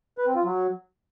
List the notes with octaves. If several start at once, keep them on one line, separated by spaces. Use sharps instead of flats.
B4
C4
F4
F#3